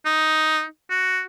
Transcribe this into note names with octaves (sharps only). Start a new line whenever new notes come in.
D#4
F#4